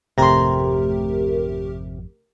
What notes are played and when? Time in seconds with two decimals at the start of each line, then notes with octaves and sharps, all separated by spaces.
0.18 G#1 F2 C3 A3 G4 A#4 A#5 C6